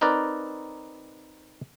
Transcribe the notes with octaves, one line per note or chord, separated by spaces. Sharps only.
C4 D#4 A#4 B4 D5